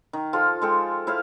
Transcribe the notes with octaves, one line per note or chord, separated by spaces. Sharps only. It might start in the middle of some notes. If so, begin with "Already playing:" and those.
D#3
F3 F4 A4
G#3 A4 G5
E4 C5 F5